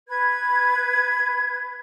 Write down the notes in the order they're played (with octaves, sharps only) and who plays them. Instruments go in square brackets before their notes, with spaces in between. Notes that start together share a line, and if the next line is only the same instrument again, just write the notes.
[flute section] B4 G#6